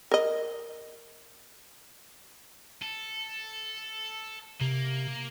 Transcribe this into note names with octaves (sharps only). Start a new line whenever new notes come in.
A#4 D#5
A4
C3 A#3